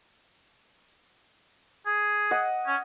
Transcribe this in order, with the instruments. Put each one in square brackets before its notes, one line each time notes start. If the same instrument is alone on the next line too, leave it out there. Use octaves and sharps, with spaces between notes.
[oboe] G#4
[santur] D#5 F#5
[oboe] C#4